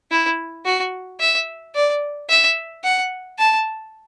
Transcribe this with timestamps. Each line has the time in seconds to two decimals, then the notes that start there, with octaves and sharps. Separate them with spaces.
0.11 E4
0.65 F#4
1.20 E5
1.75 D5
2.29 E5
2.84 F#5
3.39 A5